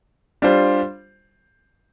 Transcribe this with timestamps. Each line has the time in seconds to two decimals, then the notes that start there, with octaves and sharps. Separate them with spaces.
0.42 G3 D4 F4 C5